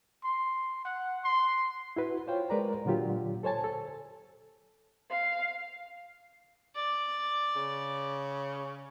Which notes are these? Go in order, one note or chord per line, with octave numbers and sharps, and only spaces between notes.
C6
F#5
C6
E4 F#4 B4
F4 C5 C#5 F5 G5
G#3 A#4 B4 D5 A#5
A#2 D3 F#3 F4 G4
A4 C5 C#5 G#5 A5
A4
F5
D5
C#3